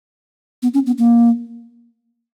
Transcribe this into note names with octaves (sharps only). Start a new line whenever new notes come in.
B3
C#4
B3
A#3